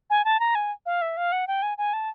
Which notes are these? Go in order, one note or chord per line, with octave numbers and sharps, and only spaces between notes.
G#5
A5
A#5
G#5
F5
E5
F5
F#5
G5
G#5
G#5
A5